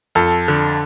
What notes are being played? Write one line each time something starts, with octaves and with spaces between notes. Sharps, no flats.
F2 A4
D3